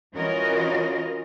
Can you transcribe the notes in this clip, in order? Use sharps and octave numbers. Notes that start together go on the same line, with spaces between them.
E3 C#4 F4 F#4 A#4 D#5